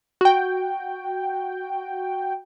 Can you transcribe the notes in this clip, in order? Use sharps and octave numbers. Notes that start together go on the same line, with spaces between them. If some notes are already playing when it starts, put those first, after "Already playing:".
F#4 G5